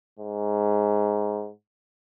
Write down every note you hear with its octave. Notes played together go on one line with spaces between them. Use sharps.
G#2